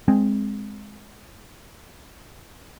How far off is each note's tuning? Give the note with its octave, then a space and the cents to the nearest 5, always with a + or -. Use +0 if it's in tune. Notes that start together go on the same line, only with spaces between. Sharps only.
G#3 +0 C4 +0